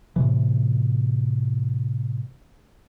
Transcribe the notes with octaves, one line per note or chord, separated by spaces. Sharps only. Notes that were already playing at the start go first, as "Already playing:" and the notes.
A2 C3 E3